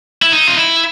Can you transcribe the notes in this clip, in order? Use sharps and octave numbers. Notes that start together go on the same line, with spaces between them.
E4
D#4
F4
E4